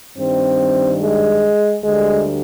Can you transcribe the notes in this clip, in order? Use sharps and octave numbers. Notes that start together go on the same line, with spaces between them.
G2 D#3 G3 C4
G#3
D2 D3 G3 G#3